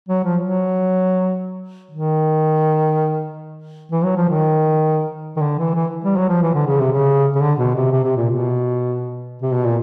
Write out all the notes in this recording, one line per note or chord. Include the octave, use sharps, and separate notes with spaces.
F#3
F3
F#3
D#3
E3
F#3
F3
D#3
D#3
D3
E3
E3
G3
F#3
F3
E3
D3
C#3
C3
C#3
C#3
D3
B2
C3
C3
C3
A#2
B2
C3
B2
A#2